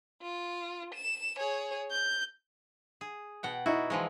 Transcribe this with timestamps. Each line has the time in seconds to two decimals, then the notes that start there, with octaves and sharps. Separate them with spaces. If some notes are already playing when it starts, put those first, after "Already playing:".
0.21 F4
0.95 E7
1.38 G#4 C#5
1.91 G6
3.01 G#4
3.43 B2 F#5 G5
3.66 D#4 E4 F#4
3.90 E3 F3 G#3